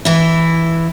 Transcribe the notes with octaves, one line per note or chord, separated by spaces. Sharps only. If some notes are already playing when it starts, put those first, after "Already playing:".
E3 E4